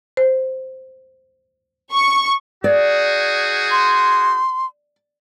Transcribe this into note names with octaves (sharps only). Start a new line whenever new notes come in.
C5
C#6
D#4 F#4 G#4 D5
C6